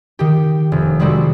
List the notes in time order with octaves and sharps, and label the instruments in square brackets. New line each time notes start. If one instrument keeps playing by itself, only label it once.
[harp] D#3 G4
F1
G3 G#3 C4 F#4 G4 A4